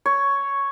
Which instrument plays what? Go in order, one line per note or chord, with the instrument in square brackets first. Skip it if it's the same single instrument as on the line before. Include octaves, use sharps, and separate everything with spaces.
[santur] C#5